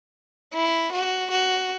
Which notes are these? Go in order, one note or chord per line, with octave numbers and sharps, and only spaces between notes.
E4
F#4
F#4